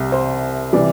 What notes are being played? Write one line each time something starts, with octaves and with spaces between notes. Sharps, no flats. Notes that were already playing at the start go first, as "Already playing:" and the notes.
Already playing: C2 C3
C5
C3 E3 G3 D5